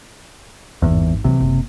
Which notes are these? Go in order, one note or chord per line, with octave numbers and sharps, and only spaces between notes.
G#1 E2 G2
C3 E3 F#3
F#1